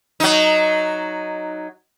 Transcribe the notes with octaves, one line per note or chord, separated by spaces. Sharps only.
F#3 D#4